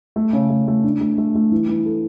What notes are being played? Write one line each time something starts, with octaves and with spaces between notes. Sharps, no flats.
A3
C#3
A3
A3
D4
A3
A3
A3
E3
E3
A4